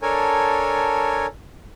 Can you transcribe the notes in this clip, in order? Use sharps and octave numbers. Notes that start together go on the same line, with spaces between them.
D4 A4 A#4 C#5 G#5